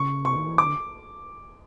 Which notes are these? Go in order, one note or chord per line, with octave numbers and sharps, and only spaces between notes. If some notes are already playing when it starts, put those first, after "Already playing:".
Already playing: C#3 C#6
C3 C#6
D#3
E3
D#3 D6
D3